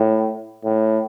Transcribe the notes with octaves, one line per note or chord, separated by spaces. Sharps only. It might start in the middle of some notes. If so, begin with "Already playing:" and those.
Already playing: A2
A2